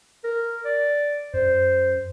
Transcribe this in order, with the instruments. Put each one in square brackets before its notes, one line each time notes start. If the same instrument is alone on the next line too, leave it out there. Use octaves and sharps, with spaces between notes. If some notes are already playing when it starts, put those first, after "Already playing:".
[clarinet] A#4
D5
[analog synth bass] F#2 [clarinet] C5